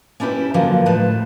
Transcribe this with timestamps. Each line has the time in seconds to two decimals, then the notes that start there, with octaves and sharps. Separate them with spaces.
0.20 C#4 D4 E4 G4 B4
0.54 D3 D#3 F3 F#3 A#3
0.86 A2 F3 B4 A5